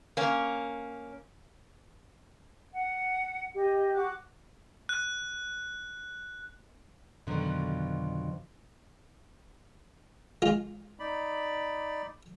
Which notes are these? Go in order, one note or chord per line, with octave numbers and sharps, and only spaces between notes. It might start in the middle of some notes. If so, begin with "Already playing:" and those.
A#3 C#4
F#5
G4 D#5
F#4 D6 F#6
F#6
F2 B2 D3 D#3 F3 F#3
G#3 F4
D#4 D5 B5